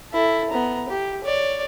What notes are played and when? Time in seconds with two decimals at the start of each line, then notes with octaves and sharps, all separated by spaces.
0.12 E4 A4
0.50 B3 A#5
0.89 G4
1.24 C#5 D5